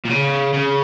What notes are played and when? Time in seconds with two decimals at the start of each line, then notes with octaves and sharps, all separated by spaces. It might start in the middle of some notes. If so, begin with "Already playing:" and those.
0.05 A#2
0.10 C#3
0.53 C#3